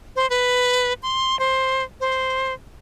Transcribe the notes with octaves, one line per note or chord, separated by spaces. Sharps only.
C5
B4
C6
C5
C5